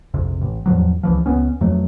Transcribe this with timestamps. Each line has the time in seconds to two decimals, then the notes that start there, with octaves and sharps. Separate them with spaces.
0.14 A#1 F2 C3
0.41 A1
0.66 E2 A2 F3 F#3
1.03 C#2 E3 F3
1.26 C#2 B3 C#4
1.61 F2 F#3 A3